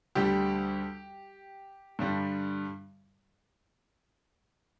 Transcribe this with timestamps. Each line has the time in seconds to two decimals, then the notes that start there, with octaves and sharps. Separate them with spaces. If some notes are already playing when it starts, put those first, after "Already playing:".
0.15 D2 D3 G3 G4 G5
1.99 G2 D3 G3